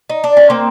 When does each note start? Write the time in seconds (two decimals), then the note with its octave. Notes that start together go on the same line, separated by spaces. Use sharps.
0.09 D#4
0.24 D4
0.37 C#4
0.50 A#3 C4